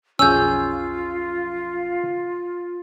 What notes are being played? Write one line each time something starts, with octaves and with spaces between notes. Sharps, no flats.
B1 F2 C#4 F4 G#4 E6 G6